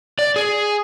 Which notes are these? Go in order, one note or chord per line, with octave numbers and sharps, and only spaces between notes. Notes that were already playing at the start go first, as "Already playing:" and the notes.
D5
G#4